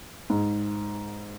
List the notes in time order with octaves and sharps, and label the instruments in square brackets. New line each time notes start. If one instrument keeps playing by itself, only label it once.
[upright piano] G#2